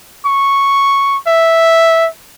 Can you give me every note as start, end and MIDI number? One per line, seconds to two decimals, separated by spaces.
0.25 1.17 85
1.27 2.08 76